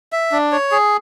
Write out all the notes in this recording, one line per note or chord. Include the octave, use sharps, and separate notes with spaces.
E5
D4
C#5
G#4